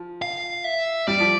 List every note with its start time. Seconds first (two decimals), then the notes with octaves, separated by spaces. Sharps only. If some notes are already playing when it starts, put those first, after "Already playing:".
Already playing: F3
0.22 F5
0.64 E5
1.07 G3 D5
1.20 F3